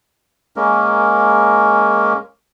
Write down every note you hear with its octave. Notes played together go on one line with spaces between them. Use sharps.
G#3 A#3 C#4 A#4